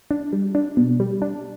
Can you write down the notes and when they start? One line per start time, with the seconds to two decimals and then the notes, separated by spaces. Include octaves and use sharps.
0.11 D4
0.33 G3
0.55 D4
0.77 B2
1.00 G3
1.22 D4